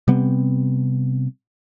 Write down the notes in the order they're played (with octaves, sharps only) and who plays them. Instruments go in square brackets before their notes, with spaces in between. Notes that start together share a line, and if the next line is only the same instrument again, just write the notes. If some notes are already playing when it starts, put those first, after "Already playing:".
[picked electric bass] C3 G3 B3 C4